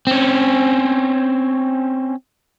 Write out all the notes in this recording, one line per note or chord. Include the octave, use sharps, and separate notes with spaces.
C4 C#4